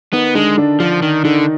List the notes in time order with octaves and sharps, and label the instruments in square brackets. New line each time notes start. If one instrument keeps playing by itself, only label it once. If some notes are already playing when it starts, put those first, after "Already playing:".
[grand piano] D#3 D#4 [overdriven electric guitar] B3
[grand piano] D3 D4 [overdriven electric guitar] G#3
[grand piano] D3 D4
[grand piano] D3 D4 [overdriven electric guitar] F3
[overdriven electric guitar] D#3
[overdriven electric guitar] D3 [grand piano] D#3 D#4